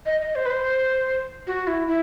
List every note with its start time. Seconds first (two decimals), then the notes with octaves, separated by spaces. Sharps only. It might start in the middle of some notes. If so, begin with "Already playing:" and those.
0.06 D#5
0.21 D#5
0.35 C5
0.46 B4
0.50 C5
1.47 F#4
1.67 E4
1.87 E4